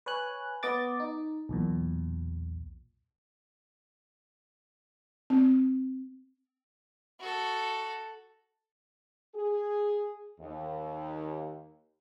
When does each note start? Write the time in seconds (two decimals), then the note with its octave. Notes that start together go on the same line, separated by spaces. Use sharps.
0.06 B4 C#5 G#5 F#6
0.63 B3 D#5 D6 A6
1.00 D#4
1.49 B1 E2 A#2
5.30 C4
7.20 F#4 A4
9.35 G#4
10.39 D#2